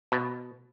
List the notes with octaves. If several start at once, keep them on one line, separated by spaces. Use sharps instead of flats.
B2